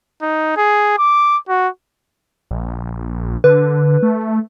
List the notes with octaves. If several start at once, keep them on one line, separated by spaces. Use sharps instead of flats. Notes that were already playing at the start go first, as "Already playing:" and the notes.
D#4
G#4
D6
F#4
A#1
D3 B4
A3